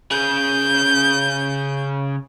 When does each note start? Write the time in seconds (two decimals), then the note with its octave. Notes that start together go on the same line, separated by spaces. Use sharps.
0.11 C#3 G#4 G6